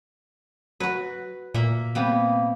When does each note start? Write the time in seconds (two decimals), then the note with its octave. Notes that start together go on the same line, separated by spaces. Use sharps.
0.80 F#3 F#4 B4
1.54 A#2 A#3 E5
1.95 C3 G3 A#3 B3